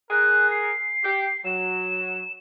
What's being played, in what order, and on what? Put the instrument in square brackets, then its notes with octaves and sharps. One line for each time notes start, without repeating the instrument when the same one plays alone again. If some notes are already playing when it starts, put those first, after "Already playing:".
[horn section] G#4 A#4 [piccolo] F#6
[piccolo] C7
[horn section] G4
[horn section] F#3 [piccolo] E7